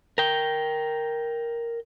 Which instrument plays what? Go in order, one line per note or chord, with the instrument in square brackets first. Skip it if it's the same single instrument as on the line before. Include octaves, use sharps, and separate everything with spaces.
[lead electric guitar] A#4 G5